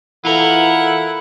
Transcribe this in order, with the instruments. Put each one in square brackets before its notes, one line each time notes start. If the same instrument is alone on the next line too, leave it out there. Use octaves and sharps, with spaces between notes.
[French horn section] E3 A4 [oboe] E4 [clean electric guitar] F4 A#4 [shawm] F#5